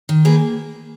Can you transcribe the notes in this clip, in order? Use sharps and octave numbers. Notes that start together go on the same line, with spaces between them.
D#3
A#3 G#4 B4